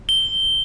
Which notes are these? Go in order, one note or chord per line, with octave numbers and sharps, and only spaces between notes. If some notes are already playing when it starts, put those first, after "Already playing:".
G7